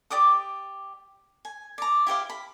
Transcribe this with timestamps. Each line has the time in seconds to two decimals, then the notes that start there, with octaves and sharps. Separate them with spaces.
0.10 G4 D5 D6 D#6
1.45 G#5
1.78 D5 A#5
2.07 E4 G4 C5 F5
2.30 B5